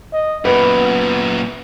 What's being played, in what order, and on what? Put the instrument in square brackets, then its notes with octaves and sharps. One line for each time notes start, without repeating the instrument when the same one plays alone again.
[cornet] D#5
[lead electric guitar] F#2 A#2 [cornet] B3 [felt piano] B4